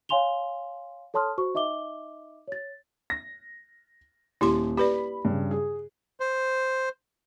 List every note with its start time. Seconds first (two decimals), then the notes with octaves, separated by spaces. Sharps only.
0.09 C#5 F5 G#5 C6 F7 G7
1.14 A4 C#5 A5 C6 D#6 F6
1.38 F#4 C5 C#6
1.54 D#4 D#5 E5 D6 G7
2.48 C#5 A6
3.10 A#6
4.41 D#1 E4 G4 C6
4.77 G4 B4 D5 B5
5.25 G2 C#3
5.51 G#4
6.20 C5